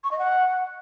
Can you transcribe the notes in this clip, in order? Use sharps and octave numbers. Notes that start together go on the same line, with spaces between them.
C#6
D#5
F#5